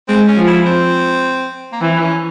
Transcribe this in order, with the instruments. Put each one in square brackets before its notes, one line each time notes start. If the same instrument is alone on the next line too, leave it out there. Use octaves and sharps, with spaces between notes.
[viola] G#3 [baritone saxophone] C4
[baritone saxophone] C#4
[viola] F3
[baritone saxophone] E4
C4
A#3
[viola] E3 [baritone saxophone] C4
[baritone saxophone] C#4